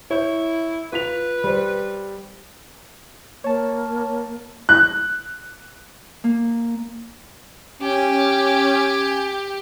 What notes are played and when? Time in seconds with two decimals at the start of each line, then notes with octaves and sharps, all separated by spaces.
0.11 E4 C#5 G6
0.93 F4 B4 B6 F7
1.44 G3 C5
3.44 A#3 C#5 A5
4.69 F#6
6.24 A#3
7.82 C#4 G4 G#5